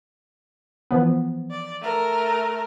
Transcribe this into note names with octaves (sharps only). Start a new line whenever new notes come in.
E3 F3 B3
D5
A3 A#4